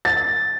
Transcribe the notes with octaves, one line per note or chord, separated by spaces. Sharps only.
A6